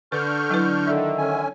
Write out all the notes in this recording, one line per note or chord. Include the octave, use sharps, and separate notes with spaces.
D3 B4 C#6 F6 G6
F#3 E4 B4
D#3 A4 D5 E5
D3 C#4 G#5